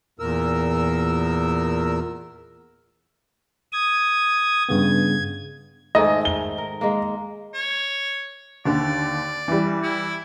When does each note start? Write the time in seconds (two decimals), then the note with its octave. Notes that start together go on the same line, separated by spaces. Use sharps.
0.20 E2 A#2 A#4 E6
3.73 D#6 G#6
4.69 G2 C#3 B3 G#6
5.95 G#2 D#3 A3 D#5 G#5
6.25 G7
6.58 A#4
6.81 G#3 A#3
7.54 C#5
8.65 D#2 D3 D5
9.48 E3 G3
9.83 E4